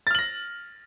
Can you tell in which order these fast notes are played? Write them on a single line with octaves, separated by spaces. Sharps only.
A6 F6 F#7 A#6